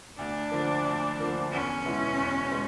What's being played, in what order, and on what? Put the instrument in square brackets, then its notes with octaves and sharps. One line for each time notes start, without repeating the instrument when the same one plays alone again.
[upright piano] D2 [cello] D4
[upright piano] D3 F3 A#3
D2
D3 F3 A#3
[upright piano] E2 [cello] C#4
[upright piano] B2 G#3 B3 E4
E2
B2 G#3